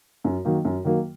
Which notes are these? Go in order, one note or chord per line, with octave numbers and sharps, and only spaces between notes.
F#2
D#3 F#3 A#3
F#2
D#3 F#3 A#3